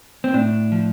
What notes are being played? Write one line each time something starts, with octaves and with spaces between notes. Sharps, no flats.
C4
A2 D4
F3